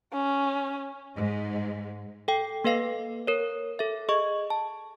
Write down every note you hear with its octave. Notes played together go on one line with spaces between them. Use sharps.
C#4
G#2
A4 G5
A#3 A4 B4 F5 C7
A#4 C#5
A4 E5
G#4 D#5 C#6
A5